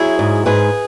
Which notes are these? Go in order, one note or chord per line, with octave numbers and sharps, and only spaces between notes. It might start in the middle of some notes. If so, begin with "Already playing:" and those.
Already playing: F#3 E4 G#4
G#2
G#2 G#4 B4